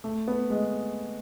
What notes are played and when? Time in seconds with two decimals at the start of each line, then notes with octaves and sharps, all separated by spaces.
0.04 A3
0.28 B3
0.50 G#3